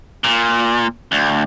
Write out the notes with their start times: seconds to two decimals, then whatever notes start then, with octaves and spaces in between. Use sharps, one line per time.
0.24 A#2
1.12 D2